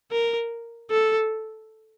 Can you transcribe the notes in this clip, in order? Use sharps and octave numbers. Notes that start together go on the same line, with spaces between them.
A#4
A4